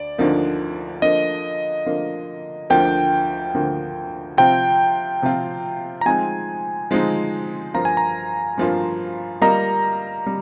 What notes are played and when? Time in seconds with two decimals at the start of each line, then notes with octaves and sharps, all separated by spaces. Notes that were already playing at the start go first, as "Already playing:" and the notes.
Already playing: D2 D5
0.18 D2 D3 F3 A#3 D#4
1.02 D3 F3 A#3 D#5
1.86 D3 F3 A#3
2.70 D2 D3 F3 A#3 G5
3.55 D2 D3 F3 A#3
4.38 C3 F3 C4 F4 G5
5.22 C3 F3 C4 F4
6.01 A#5
6.06 F3 G#3 C4 D#4 G#5
6.91 F3 G#3 C4 D#4
7.74 G2 F3 A#3 F4 C5 A#5
7.85 G#5
7.97 A#5
8.57 G2 F3 A#3 F4 C5
9.42 G3 A#3 F4 A#4 D#5 A#5
10.26 G3